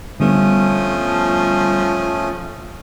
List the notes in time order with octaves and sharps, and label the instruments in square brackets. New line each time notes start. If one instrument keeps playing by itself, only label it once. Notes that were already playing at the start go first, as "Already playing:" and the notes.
[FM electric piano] D3 G3 B3 [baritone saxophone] F3 [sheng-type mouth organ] A3 C#4 D#6